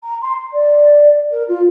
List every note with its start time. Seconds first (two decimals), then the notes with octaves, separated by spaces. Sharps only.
0.04 A#5
0.21 C6
0.52 D5
1.32 A#4
1.48 F4